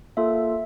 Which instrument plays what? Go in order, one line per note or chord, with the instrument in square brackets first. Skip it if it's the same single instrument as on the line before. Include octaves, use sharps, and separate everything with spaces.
[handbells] A#3 F4 A4 E5